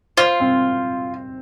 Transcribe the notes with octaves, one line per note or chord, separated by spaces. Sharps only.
F4 C5
C4